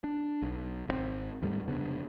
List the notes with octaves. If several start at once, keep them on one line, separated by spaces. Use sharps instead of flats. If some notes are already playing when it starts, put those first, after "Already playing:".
D4
B1
G#1 D#3 C4
D#2 G#2 G3 A3
F1 C#3 B3 D4